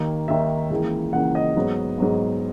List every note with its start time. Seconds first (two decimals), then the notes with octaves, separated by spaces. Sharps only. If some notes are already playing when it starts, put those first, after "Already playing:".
Already playing: D#2 D#3 A#3
0.28 D#2 D#3 A#3 E5
0.70 C#2 C#3 E3 A#3
1.13 C#2 C#3 E3 A#3 F#5
1.35 D#5
1.56 G#2 F#3 B3
1.98 G#2 F#3 B3